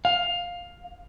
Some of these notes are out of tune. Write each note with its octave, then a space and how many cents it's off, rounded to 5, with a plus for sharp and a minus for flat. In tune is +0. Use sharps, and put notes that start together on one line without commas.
F5 +10